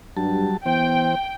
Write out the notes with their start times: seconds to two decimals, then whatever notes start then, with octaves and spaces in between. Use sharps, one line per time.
0.17 G2 F#3 G3 A5
0.66 E3 B3 C5 G5